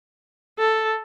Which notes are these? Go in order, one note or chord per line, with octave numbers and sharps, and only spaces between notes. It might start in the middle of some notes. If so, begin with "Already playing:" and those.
A4